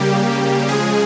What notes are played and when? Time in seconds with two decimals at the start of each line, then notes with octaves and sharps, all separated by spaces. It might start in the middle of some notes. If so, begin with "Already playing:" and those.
Already playing: C#3 G3 A#3 G4
0.68 C#3 F3 G#3 G#4